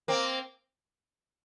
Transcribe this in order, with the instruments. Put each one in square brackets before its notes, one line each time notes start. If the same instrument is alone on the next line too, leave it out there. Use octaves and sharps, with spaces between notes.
[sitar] A#3 C4